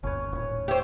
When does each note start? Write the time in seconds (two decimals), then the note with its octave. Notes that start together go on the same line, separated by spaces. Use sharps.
0.03 G1 D#2 C#4 B4 C#5
0.33 D#1 A2
0.68 G4 C5 C#5 E5